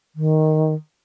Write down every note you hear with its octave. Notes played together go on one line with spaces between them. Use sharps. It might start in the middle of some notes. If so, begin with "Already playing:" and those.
D#3